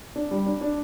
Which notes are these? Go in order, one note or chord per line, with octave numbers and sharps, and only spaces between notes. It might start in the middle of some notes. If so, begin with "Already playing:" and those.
D4
G3
D4
D4